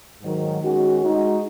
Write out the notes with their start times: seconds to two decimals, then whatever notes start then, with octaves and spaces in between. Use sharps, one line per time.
0.21 G#2 D#3 F#3
0.61 D#3 G#3 C#4 F#4
0.99 G#3 D#4 F#4